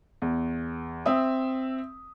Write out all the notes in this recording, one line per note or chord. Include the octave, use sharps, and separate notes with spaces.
E2
C4 E5 D#6